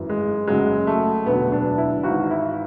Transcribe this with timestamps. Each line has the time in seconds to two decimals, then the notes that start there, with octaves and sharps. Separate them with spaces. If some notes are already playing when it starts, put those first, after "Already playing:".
Already playing: G#1 F#2 E3
0.09 G#3
0.47 F#1 F#2 C#3 F#3 G#3
0.87 A3
1.25 E1 D2 D3 F#3 B3
1.52 D4
1.78 E4
2.03 G#1 G#2 E3 F#4
2.30 E4